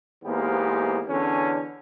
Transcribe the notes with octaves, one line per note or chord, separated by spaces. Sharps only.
E2 G#2 A#3 B3 G4 C5
E2 D3 C#4